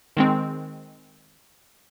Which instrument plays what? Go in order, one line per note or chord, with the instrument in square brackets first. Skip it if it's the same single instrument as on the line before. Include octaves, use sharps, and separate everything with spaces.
[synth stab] D#3 G#3 C4